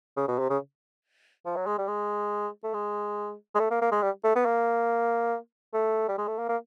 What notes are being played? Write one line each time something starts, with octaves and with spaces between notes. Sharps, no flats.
C#3
B2
C3
C#3
F3
F#3
G#3
G3
G#3
A3
G#3
G#3
A3
A#3
A#3
G#3
G3
A3
B3
A#3
A3
G3
G#3
A3
A#3
A#3